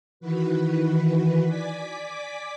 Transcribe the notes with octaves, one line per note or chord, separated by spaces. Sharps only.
D#3 E3 F#4 B4
D5 G#5 D6 B6